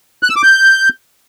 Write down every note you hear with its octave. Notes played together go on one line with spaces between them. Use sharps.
F#6
E6
D6
G6